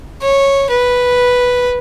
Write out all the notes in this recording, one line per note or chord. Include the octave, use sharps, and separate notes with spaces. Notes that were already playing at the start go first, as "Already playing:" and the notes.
C#5
B4